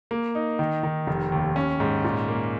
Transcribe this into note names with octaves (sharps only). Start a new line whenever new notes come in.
A#3
D#4
D#3
D#3
F1
D#2
C#4
G#2
A#2
A#3